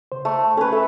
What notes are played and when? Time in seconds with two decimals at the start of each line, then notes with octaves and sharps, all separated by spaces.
0.12 C#3 C5
0.25 A3
0.57 C#4 A4 B4
0.72 A4 E5